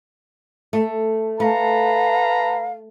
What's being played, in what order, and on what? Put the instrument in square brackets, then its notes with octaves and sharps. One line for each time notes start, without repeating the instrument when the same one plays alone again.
[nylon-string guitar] A3
[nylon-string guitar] A3 [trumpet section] B4 A5 A#5 [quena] F5